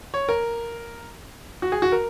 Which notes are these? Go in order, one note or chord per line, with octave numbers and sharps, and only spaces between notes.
C#5
A#4
F#4
G#4
F#4
A#4